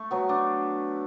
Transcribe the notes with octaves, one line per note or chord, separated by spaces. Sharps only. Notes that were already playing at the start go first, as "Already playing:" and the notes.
Already playing: A3
F#3 B3
A3 D4